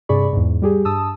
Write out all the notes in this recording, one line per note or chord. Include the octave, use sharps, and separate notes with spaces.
G2 C3 G#4 D5 B5 C#6
E2 G#2
G3 G4 G#4
G2 A5 D#6 E6